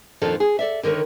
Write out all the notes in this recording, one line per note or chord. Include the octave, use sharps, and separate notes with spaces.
F2 A#2 D#3 F3 D4 A4
G#4
A4 D5 E5
D3 D#3 A#4 B4 C#5